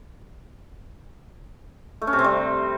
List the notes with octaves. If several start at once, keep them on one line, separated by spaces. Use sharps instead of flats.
A3
C#4
C3
C4
G3